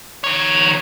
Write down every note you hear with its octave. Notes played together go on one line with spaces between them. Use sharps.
D#3 C#5